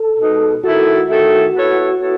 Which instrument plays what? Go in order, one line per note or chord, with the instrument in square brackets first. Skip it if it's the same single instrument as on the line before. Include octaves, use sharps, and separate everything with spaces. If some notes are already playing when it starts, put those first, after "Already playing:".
Already playing: [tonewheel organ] A4
[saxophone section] B2 G#3 D#4
[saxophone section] D#3 A3 E4 A4 [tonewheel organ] F#4
[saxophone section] D#3 A3 E4 A4
B3 E4 A4 C#5
B3 E4 A4 C#5